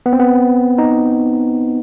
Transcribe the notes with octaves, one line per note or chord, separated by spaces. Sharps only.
B3
C4
B3
D#4